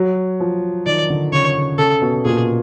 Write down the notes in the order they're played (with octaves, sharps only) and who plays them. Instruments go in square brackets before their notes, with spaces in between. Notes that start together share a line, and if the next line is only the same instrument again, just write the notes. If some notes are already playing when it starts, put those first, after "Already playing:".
Already playing: [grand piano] F#3
F3
[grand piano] D#3 [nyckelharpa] D5
[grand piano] D3
[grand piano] C#3 [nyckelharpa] C#5
[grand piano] C#3
[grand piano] C#3 [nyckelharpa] A4
[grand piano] B2
[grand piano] A#2 [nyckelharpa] G#4